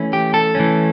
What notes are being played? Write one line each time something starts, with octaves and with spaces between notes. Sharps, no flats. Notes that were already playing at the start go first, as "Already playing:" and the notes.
Already playing: E3 A3 C#4
G4
A4
E3 A3 C#4